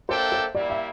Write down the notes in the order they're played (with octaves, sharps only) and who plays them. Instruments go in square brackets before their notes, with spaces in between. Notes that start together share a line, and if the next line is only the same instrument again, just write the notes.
[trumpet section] A#3 D4 A4 E5 G5 [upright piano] C5
[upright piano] C5
[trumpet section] G3 A#3 E4 [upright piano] D5
[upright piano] E5